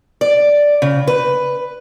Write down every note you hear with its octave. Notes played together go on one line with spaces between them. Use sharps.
D5
C#3
B4